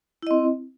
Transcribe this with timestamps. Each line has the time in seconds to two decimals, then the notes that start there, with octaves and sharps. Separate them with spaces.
0.23 E4
0.27 D#5
0.31 C4